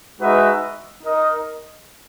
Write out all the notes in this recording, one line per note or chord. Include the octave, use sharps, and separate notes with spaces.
G#3 D#4 F#4 B4 E5
D#4 A#4 D#5